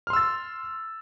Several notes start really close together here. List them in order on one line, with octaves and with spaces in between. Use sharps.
F6 C6 E6 A6